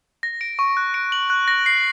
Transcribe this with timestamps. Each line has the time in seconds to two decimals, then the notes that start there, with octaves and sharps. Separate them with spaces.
0.23 A#6
0.41 D7
0.59 C#6
0.77 F#6
0.94 D7
1.12 F#7
1.30 F#6
1.48 A#6
1.66 C7